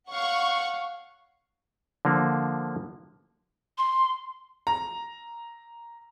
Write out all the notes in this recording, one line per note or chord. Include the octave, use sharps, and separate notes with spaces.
C#5 F5 F#5 C#6
D3 F3 A#3
C6
A#5